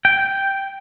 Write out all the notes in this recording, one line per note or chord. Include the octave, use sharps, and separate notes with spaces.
G5